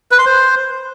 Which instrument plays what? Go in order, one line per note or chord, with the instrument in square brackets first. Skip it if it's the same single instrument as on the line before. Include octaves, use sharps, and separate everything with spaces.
[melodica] B4
C6
C5